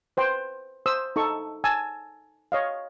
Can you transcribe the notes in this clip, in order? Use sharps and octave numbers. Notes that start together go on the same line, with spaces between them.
B4 C5 G5
C5 D#6 E6
D#4 A4 C#6
G#5 A5 E6
C#5 D#5 F5